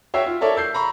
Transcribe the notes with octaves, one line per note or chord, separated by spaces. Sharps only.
F#4 C#5 E5 G5 E6 C7
F4
A4 A#4 C#5 D5 E5
E6 G6 C7
A#5 B5 C#6